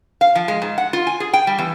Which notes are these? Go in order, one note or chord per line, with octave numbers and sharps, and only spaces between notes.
F5
F3
G#3
G#2
F#5
F4
G#5
G#4
G5
G3
E2